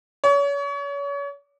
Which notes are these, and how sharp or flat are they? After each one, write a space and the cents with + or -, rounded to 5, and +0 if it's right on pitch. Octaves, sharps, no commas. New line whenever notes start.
C#5 +35